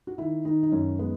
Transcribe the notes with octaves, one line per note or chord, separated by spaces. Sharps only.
F#4
D#3 E4
D#3 D#4
D#4
F#2 C#4
G#3 B3